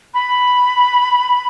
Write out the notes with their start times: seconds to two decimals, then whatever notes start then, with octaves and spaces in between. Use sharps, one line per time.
0.14 B5